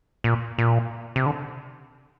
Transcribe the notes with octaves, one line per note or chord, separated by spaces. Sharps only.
A#2
A#2
C3
D3